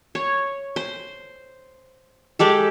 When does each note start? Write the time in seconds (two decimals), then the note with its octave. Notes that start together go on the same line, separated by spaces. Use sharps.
0.15 C#5
0.76 C5
2.39 G#3 G4 A4